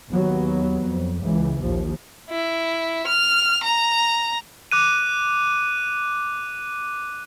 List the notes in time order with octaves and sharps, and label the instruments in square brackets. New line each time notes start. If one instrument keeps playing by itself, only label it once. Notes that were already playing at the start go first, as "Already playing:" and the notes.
[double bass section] D#2 F#3 B3
F2
C#2 E3
A#1 D#2 F3
[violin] E4
F6
A#5
[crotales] D6 F#6 D#7